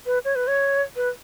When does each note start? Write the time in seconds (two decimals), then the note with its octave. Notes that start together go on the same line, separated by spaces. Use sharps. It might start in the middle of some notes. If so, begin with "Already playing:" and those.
0.06 B4
0.25 C#5
0.35 B4
0.47 C#5
0.96 B4